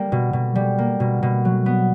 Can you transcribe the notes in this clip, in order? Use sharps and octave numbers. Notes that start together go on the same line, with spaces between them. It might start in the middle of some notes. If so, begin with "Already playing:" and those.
Already playing: G3 A#3
B2
B2
G3
A#3
B2
B2
F#3
B3